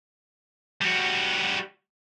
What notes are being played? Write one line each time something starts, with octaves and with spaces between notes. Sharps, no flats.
G3 F#4